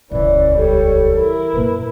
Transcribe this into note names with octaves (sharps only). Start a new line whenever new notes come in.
D#1 C#2 E3 C#4 D5
G3 A4 C#5
E3 E4 A#4
F#2 A#2 B4